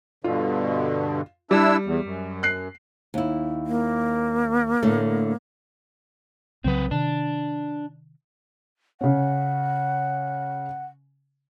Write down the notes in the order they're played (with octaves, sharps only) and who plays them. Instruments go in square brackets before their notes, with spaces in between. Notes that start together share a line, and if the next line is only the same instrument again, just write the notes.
[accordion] G2 B2 D3 [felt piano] F4
[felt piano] G3 [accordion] D4 E4 E6
[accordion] E2
F#2
[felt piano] F#6 C7
[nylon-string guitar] D#2 E4
[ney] A#3
[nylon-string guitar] A2 D3 A3
[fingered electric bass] C2 C#3 F#3 [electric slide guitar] C4 B4
[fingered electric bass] C3 D#3 [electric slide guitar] D4
[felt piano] C#3 C#4 [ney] F#5